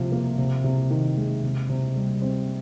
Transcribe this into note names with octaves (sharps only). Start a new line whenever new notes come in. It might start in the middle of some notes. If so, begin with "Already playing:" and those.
Already playing: C3 F3 F4
A#3
C3
C3
D#3
G#3
C3
C3
G3
C4